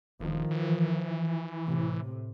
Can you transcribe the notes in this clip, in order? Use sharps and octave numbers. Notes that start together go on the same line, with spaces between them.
E1 D#3 F3
E3
A2 C3